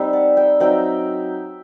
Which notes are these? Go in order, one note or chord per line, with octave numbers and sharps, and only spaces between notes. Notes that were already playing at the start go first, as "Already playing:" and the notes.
Already playing: G3 C4 D#4 E5
F#5 A5
E5 G5
F#3 C4 D#4 E5 G5